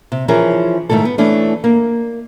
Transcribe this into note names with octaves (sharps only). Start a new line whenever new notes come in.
C3
E3 F3 C#4 G#4 A#4
G#2 D#3 A3 E4 A4
B3
E3 A3 C#4 D4
A#3